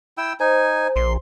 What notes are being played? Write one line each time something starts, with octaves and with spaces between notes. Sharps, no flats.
E4 G5 E6
D#4 C5 G#5
A#1 C6